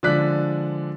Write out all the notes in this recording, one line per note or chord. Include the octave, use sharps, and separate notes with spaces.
D3 F3 G#3 D5 F#6 B6